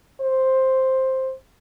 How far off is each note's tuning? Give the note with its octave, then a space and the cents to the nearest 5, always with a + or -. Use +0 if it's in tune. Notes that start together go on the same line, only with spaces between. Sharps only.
C5 +5